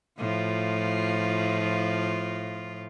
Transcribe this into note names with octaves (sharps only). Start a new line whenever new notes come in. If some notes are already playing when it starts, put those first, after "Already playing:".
A2 F3 F4